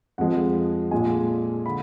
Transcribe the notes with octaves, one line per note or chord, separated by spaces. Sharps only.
F2 F3 G#3 F#5
A#2 G#3 G#5
D3 B5